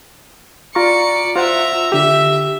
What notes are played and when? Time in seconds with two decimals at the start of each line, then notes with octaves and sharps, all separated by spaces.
0.75 F4 D5 A#5 C#6 C#7
1.36 F4 C5 E5 F#5 A#5
1.92 D3 G4 E5